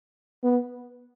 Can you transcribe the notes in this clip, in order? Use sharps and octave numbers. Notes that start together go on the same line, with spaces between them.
B3